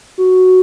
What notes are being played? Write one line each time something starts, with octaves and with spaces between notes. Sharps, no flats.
F#4